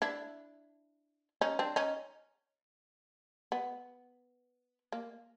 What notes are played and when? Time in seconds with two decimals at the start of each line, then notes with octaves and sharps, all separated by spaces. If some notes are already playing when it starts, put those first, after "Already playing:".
0.02 D4 E4
1.41 C#4 D#4
1.59 C4 D4
1.76 C#4 D#4
3.52 B3
4.92 A#3